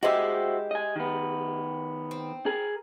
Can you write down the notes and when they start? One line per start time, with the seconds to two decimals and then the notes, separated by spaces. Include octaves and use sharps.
0.03 G#3 E4 F#4 G4 C5 E5
0.71 D#5 G#5
0.96 D#3 B3
2.11 C4
2.46 G#4 A#4